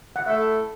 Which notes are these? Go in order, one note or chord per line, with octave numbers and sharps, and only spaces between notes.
F#5
A3 E4 A4 E5